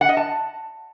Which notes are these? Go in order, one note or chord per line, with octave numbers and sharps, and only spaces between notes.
F#5
D#5
A5